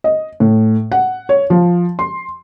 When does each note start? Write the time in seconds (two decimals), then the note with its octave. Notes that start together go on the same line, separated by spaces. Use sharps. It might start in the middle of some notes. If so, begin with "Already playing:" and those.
0.04 D#5
0.40 A2
0.92 F#5
1.29 C#5
1.50 F3
1.99 C6